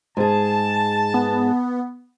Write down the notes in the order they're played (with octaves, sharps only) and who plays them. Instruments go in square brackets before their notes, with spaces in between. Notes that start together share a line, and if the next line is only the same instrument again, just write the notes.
[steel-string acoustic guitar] G#2 G#4 [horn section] A5
[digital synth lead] B3